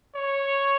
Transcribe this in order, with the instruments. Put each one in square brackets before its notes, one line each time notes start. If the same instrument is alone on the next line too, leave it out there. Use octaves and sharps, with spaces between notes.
[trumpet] C#5